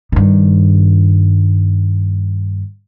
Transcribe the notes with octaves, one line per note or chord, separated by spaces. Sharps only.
G2 D#3